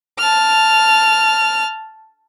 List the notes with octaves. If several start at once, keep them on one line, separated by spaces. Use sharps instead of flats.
A5 F6